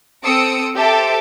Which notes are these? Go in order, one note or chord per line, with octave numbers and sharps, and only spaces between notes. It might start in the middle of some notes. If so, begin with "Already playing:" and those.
C4 A4 D#6 E6 C#7 D7
G4 A4 C5 E5 A5 D6